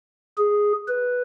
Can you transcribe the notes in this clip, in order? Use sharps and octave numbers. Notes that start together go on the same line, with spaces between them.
G#4
B4